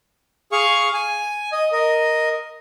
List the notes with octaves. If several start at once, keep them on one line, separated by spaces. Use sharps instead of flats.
G#4 F5 C#6
G#5
D#5
A#4 D#5